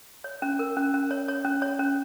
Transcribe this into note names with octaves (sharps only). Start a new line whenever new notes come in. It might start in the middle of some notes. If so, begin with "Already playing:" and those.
C#5
C#4
A#4
C#4
C#4
C#5
C#5
C#4
C#5
C#4